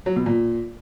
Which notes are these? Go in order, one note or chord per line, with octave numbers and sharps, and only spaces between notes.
F#3
B2
A#2